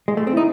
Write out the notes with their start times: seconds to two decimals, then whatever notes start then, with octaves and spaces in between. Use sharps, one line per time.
0.08 G#3
0.17 A3
0.27 C4
0.32 D#4 E4